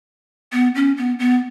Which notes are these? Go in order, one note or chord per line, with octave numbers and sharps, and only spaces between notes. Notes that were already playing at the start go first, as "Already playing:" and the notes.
B3
C#4
B3
B3